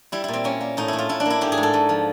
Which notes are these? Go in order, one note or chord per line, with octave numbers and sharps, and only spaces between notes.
G3 E4
A#2 E4
C4
A#3 C#4
A#3
A2 D#4
A2 E4
F4
A2 E4
D4
A#3 E4
G#2 G4
G#4
G#2
A4
G#2
F3